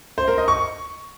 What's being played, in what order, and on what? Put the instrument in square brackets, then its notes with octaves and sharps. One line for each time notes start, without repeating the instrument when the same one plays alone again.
[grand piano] C5
A#4
D#5
C#6